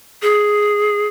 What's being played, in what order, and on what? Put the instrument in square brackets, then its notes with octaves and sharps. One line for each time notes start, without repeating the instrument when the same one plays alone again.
[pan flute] G#4